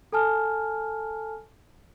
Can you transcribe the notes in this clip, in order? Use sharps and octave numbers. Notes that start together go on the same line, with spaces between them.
A4 G#5 A5 F6